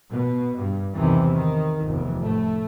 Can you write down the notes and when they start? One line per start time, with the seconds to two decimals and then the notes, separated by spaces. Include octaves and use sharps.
0.12 B2
0.59 G2
0.94 B1 E2 C3 D#3 E3
1.32 D#3
1.85 F1 E2
2.22 A2 A3